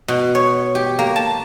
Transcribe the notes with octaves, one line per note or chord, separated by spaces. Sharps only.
B2
C#5
G4
A#3
A5